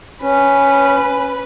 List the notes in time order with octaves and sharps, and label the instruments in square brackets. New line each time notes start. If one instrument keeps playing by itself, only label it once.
[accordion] C#4 [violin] B4